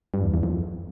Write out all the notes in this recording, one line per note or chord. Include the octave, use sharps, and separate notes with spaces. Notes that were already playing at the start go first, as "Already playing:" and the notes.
G2
E2
E2
F2